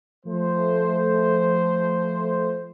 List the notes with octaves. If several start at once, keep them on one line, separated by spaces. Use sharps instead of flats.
F3 A3 C5